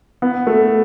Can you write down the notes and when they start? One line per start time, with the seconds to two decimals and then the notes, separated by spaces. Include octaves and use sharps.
0.22 B3
0.47 A3